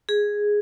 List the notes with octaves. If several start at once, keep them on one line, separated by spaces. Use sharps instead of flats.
G#4